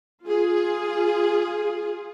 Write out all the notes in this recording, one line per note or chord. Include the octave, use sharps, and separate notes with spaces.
F4 G#4